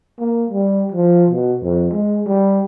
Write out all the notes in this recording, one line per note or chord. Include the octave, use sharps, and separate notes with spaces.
A#3
G3
F3
B2
F2
G#3
G3